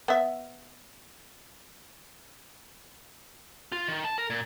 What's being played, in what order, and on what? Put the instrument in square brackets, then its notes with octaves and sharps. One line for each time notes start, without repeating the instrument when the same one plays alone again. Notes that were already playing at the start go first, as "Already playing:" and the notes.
[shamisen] B3 E5
[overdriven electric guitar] F4
D#3
A5
A#4
A#2